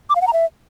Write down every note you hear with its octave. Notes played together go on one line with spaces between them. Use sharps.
D6
F5
F#5
A#5
E5